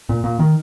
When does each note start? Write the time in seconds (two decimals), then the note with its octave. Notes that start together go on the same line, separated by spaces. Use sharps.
0.09 A#2
0.24 A#2
0.39 D#3